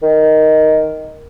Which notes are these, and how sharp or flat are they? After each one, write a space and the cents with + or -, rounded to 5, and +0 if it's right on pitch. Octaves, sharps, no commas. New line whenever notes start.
D#3 +5